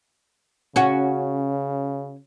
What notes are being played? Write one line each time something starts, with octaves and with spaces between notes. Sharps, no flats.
C#3 C#4 F#4